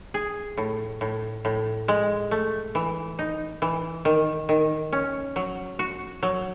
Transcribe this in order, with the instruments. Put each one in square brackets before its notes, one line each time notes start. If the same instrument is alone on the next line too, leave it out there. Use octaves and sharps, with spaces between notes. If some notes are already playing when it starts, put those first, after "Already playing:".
[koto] G#4
A2
A2
A2
G#3
A3
E3
D#4
E3
D#3
D#3
C#4
F#3
F#4
F#3